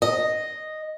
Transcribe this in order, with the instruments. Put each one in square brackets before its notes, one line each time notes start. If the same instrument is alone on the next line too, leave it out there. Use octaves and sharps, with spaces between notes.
[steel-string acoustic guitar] D#5